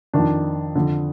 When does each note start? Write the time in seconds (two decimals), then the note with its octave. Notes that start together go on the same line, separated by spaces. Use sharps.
0.13 F2 D#3 D4
0.76 F2 D3